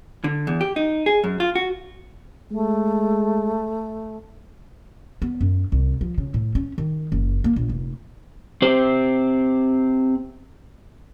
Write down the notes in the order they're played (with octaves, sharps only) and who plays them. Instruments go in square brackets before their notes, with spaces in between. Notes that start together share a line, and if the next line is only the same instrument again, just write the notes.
[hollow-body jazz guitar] D3
E2
G4
D#4
G#4
F#2
F4
F#4
[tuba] G#3 [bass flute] A3
[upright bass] B3
F#2
C2
F3
C#3
A2
C#4
D#3
F#1
A#3
A#1
F1
[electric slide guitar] C4 G4 C5